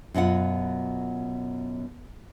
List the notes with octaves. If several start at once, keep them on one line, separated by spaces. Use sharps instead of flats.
F#2 B2 F4 F#5